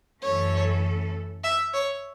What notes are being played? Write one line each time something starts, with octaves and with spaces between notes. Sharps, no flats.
F#2 E3 A3 C#4 A4 C#5
E5
C#5